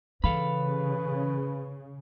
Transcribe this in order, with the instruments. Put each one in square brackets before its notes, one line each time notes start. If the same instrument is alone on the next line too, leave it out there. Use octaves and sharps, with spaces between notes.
[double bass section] C#3 [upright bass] E3 [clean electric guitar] A4 F5 B5 [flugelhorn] B4